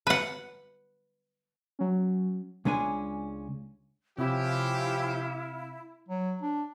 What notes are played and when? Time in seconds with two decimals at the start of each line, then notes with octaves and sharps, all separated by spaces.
0.07 B4 F#5
1.79 F#3 C#4
2.65 C#2 G#3 C#4 D4 G#5
4.18 C3 F3 C#4 E4 G4 F5
6.09 F#3
6.42 D4